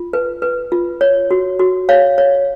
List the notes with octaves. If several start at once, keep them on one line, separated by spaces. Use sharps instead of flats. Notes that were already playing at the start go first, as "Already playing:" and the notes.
Already playing: F4
B4
B4
F4
C#5
F#4
F#4
C#5 F5
C#5